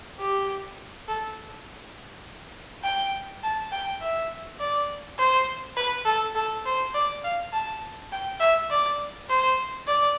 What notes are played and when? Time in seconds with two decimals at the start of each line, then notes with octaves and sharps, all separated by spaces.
0.20 G4
1.08 A4
2.84 G5
3.43 A5
3.72 G5
4.01 E5
4.60 D5
5.18 C5
5.77 B4
6.06 A4
6.35 A4
6.65 C5
6.94 D5
7.24 F5
7.52 A5
8.12 G5
8.40 E5
8.70 D5
9.29 C5
9.87 D5